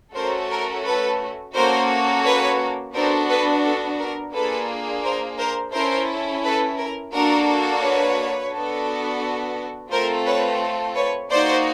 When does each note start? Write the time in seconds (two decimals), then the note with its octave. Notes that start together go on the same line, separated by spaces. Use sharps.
0.15 A3 C#4 F#4 A4 A#4 C5
0.50 A#4
0.85 A4 B4
1.54 A#3 C#4 F#4 A4 A#4 C5
2.24 B4 C#5
2.94 B3 D4 F#4 A4 A#4 C5
3.29 A4 B4
3.64 A4
3.98 A#4
4.33 A#3 D4 F4 G#4 A4 B4
5.03 A#4 C5
5.38 A#4 C5
5.73 C#4 E4 A4 A#4 C5
6.43 A4 B4
6.78 A#4
7.12 A#3 D4 F#4 A4 A#4
7.82 B4 C#5
8.52 B3 D4 F#4 A4
9.91 A3 C4 F4 A4 A#4 C5
10.26 B4 C#5
10.96 B4 C#5
11.30 A#3 D#4 F#4 C5 D5